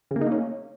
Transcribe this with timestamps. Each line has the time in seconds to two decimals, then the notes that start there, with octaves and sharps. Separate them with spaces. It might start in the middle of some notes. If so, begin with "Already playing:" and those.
0.11 C#3
0.16 A#3
0.21 D#4
0.27 A#3
0.32 C#4